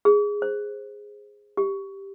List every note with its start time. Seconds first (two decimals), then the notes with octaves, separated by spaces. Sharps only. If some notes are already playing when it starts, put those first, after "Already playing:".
0.05 G#4
0.42 C5
1.57 G4